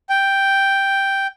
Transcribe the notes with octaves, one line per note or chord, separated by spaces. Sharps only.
G5